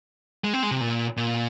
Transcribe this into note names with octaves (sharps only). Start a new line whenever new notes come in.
G#3
C4
G#3
C3
A#2
A#2